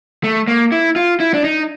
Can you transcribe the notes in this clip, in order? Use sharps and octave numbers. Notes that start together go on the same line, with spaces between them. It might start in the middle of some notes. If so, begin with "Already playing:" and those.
A3
A#3
E4
F4
E4
D4
D#4